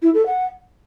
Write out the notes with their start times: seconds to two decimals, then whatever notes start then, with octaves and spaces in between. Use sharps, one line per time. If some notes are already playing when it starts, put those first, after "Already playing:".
0.02 E4
0.14 A4
0.26 F#5